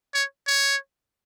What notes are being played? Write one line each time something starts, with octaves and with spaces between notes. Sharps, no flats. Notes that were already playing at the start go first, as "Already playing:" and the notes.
C#5
C#5